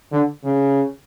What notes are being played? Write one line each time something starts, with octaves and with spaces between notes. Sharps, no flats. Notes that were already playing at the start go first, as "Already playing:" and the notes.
D3
C#3